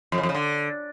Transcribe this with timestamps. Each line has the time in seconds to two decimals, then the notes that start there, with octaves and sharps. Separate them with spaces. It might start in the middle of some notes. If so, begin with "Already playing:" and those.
0.12 F2
0.18 C#3
0.23 F2
0.29 C#3
0.35 D3